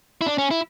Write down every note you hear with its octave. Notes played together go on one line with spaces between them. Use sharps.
E4
D4
C#4
E4